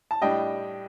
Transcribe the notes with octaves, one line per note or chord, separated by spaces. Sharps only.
A5
A2 G3 D4 D#5 G5